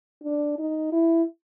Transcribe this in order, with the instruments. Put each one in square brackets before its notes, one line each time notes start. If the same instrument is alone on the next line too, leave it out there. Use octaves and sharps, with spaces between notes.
[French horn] D4
D#4
E4